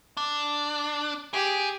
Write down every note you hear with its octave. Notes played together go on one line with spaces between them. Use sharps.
D4
G4 G#4